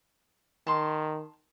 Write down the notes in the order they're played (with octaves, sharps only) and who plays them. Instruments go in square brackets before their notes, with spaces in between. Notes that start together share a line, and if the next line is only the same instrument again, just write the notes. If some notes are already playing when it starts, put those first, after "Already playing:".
[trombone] D#3 [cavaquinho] A5 C6